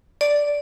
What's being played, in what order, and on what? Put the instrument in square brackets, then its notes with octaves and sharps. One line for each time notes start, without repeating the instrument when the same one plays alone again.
[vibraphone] D5